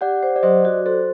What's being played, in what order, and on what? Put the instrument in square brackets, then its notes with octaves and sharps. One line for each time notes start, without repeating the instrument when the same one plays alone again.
[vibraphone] G4 [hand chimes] D5 F#5
[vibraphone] C5 [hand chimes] D5
[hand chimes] D5
[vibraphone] F#3 [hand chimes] C5 D#5
[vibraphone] F#4 [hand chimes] D5
[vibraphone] A4 [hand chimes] C5